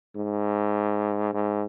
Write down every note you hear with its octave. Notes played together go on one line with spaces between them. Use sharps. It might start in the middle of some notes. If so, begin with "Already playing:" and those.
G#2
G#2